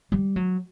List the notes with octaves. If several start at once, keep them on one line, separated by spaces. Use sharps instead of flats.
G3
F#3